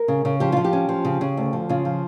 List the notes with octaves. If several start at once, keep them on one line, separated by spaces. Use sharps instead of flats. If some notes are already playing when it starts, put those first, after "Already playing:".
Already playing: A#4
C#3
C#3
F3 G4
F3 F4
G4
C#4
F3
C#3
C#3
D2
F3
C#3 F4
F3